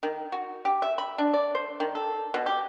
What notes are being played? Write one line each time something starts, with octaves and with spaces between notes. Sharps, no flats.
D#3
F#4
G4
E5
B5
D4
D5
C5
D#3
A4
B2
G4